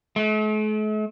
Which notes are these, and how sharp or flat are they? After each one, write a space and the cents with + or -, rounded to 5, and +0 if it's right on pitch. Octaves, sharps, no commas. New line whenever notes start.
A3 -45